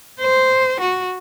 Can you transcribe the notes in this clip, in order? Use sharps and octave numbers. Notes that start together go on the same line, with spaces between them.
C5
F#4